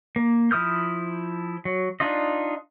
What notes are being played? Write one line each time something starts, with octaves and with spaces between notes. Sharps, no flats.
A#3
F3 E4 D#6 F6 G6
F#3
D4 D#4 F4 D#5